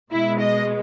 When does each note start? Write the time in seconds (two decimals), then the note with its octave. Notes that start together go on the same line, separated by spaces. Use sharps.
0.11 B2 G#3 E4
0.40 D#5